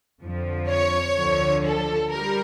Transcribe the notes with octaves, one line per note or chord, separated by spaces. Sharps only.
F2 D3 F3
C#5
D2 D3 F3
A4
G3 A#4